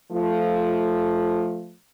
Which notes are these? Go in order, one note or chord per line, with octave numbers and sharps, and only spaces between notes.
F3 A3